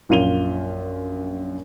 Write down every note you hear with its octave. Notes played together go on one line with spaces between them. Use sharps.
A#1 F#2 F4 D#7 F7 G7